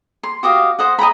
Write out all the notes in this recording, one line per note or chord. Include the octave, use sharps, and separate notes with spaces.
C6
F#4 G4 D#5 F5
C5 D#5 F#5
D#5 G5 A#5 B5